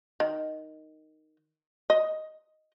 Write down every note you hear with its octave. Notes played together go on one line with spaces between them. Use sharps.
D#3
D#5